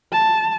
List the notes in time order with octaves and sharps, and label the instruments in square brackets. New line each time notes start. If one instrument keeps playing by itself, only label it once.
[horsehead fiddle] A5